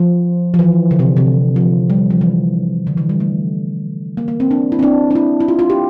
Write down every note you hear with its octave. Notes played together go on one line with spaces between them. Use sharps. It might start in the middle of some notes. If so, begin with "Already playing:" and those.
Already playing: F3
F3
E3
D3
C3
C3
F3
G3
F3
E3
D3
E3
G3
A3
A#3
A#3
C4
D4
E4
C4
D4
D4
E4
E4
F4
F4
G4